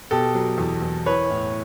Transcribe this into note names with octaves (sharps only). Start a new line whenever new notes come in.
B2 G4 A4
F#3
E2
E2
E3 B4 C#5
A2